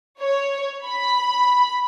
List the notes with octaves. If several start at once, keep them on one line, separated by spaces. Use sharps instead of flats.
C#5
B5